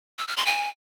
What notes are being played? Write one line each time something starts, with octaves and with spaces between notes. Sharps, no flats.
E6
F6
C6
G#5